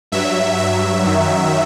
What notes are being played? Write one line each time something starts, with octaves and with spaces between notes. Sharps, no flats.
G2 F#3 E5
E5
F#2 D#3 F#3